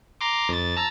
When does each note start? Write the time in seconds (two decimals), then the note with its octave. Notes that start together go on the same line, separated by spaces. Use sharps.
0.21 A#5 C6 D6
0.49 F2 A6
0.76 A5 A#5 E6